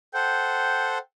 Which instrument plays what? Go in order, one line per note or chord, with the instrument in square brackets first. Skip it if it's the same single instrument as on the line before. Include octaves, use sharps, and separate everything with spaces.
[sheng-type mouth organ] A4 C5 F#5 [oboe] G5